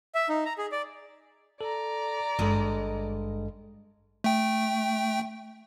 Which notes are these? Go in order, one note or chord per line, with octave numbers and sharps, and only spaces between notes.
E5
D#4
A#5
G#4
D5
A4 D5 A#5
G#1 G2 G#3 A4 D#5
A3 G5